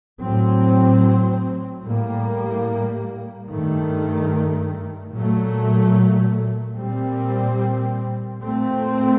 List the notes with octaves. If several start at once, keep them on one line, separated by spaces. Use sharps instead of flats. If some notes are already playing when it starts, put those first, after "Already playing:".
A2 F#3 C4
A2 G3 A#3
G2 D#3 A3
A#2 F#3 A3
A#2 G3 C4
A#2 A3 C4